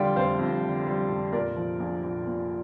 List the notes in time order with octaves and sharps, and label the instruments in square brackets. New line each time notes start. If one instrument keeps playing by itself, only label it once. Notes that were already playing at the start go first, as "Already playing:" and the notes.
Already playing: [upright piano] F2 D3 G3 D5 F5 G5 C6
F1 C5 F5
F2
D3
G3
F1
A#2 A#4 D5
F3
A#1
A#1
A#2